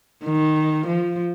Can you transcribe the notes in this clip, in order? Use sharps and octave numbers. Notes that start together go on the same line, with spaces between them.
D#3
F3